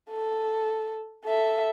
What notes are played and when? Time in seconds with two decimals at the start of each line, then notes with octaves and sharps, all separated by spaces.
0.10 A4
1.25 A4 E5